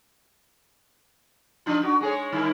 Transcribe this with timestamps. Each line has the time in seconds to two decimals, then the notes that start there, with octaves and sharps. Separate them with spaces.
1.66 F3 D4 F4
1.82 D4 F#4
2.01 G#3 G#4 C#5
2.32 G2 D#3 E4